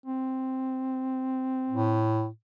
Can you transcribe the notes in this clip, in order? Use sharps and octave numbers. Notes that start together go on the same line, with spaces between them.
C4
A2